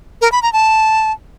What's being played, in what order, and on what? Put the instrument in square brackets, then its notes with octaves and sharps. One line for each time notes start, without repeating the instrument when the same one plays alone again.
[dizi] A#4
B5
A#5
A5